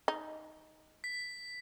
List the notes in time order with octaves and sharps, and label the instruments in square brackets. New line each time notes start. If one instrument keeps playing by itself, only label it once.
[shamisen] D#4
[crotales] B6